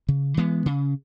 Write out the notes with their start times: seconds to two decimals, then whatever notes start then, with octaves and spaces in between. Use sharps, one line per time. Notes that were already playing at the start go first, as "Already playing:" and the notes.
0.09 C#3
0.37 E3 G#3 B3
0.66 C#3